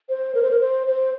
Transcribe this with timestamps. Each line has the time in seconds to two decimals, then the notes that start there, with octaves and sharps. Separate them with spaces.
0.09 C5
0.35 A#4
0.42 C5
0.51 A#4
0.60 C5
0.87 C5